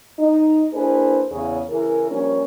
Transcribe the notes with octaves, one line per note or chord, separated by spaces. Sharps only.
D#4
A#3 D4 E4 G#4 B4 C5
E2 C#3 G#4
C#3 E3 E4 G#4 A#4
F3 G3 A#3 C#4